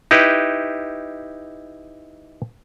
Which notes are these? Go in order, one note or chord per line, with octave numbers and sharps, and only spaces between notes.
D#4 E4 G4 B4